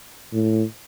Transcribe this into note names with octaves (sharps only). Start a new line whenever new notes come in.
A2